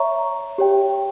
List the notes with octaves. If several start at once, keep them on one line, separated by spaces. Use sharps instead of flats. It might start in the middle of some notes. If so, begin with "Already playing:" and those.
Already playing: C#5 E5 A#5 C#6
G4 C#5 G5